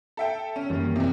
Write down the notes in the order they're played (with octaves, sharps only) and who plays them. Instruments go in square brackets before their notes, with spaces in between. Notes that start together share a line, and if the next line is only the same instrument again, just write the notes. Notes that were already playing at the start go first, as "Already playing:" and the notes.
[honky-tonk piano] A4 E5 G5
C#4
[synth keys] F#2 D#3 E3 [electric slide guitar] G3 A#3
[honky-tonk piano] E2 C3